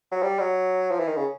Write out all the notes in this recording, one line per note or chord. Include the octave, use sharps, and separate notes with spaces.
F#3
G3
F#3
F3
E3
D#3
C#3